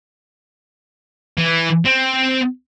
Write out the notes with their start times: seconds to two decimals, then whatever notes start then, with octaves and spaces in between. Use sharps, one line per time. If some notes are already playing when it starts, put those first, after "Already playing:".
1.37 E3
1.85 C4